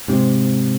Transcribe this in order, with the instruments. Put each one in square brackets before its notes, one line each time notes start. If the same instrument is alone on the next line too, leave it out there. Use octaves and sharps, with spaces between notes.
[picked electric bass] G#2 C3